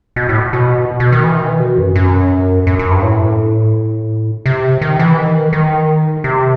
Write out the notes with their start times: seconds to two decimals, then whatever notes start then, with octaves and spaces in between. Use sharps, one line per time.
0.16 B2
0.29 A2
0.53 B2
1.00 B2
1.12 D#3
1.24 E3
1.36 D#3
1.48 E3
1.60 B2
1.78 F#2
1.95 F#2
2.67 F#2
2.79 F#2
2.91 G2
3.02 A2
4.46 C3
4.81 D#3
4.99 E3
5.17 D#3
5.53 D#3
6.24 C3